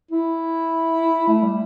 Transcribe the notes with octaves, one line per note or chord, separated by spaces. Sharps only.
E4
A3
G3